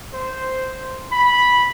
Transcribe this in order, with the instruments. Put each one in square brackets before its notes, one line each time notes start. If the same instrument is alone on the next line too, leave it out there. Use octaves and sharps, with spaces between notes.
[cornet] C5
B5